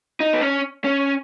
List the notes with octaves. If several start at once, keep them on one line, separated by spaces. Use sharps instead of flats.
D#4
B3
C#4
C#4